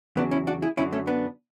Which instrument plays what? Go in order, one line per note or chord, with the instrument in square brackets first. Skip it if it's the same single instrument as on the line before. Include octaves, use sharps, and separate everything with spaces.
[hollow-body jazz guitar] E2 C#3 F#3 B3 D4
C#4 E4
D4 F#4
E4 G#4
F#2 D3 F#3 C#4 E4
A3 C#4
B3 D4